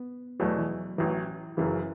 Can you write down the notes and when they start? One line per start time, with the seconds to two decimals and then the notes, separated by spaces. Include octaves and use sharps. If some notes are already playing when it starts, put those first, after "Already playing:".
Already playing: B3
0.40 E2 B2 F#3 A3 E4
0.59 E3
0.98 A1 A2 E3 F#3
1.57 F#1 F#2 C#3 E3